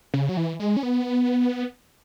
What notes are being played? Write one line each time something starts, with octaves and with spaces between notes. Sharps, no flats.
C#3
F#3
E3
G#3
C#4
B3